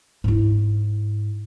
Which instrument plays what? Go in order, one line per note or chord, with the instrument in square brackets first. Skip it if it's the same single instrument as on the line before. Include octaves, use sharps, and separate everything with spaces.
[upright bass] G#2 E4